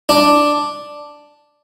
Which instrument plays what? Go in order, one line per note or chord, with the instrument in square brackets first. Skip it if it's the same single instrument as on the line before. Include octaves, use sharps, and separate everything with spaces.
[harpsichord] D4